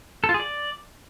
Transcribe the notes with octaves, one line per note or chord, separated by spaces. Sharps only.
A4
F4
G#4
D5